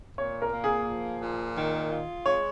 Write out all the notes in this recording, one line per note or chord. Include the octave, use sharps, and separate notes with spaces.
A#2 C#5
A#4
A#3
G#4
F3
A#2
D#3
F4
G#3 C#5